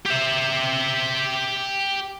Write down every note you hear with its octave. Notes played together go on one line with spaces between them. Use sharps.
G4 E5